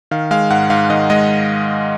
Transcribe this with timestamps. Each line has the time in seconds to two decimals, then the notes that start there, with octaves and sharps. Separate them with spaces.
0.11 D#3 F5
0.31 G#3 F5
0.50 G#2 F#5
0.70 G#2 F5
0.90 D#3 D#5
1.10 G#3 D#5